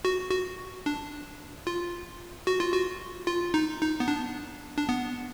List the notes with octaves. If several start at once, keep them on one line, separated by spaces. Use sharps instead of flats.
F#4
F#4
D4
F4
F#4
F4
F#4
F4
D#4
D#4
B3
D4
D4
B3